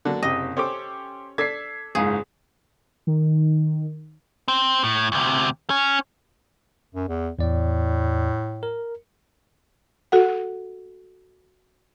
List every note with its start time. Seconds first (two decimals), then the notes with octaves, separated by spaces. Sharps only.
0.05 D3 F#3 A#3
0.23 F#1 C3 G4 D#5
0.57 C#4 G4 A4 C5 D6
1.38 D4 A4 D6 G#6 B6 C7
1.95 F#1 C#2 G#2 G#4
3.07 D#3
4.48 C4
4.84 A2
5.12 D2 C3
5.70 C#4
6.95 F#2
7.08 E2
7.39 E2 A2 D5
8.63 A#4
10.12 F#4 A4 F#5